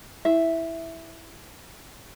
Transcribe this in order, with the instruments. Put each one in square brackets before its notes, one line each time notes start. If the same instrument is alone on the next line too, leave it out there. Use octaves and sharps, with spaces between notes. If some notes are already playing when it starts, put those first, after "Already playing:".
[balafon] E4 [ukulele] E5